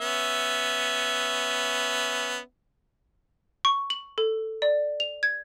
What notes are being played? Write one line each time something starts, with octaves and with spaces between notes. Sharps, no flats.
B3 C#4 E5
C#6
F#7
A4
D5
F7
G#6